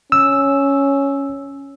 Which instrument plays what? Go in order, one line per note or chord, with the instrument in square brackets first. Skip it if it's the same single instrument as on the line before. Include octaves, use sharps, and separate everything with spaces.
[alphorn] C#4 [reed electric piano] E6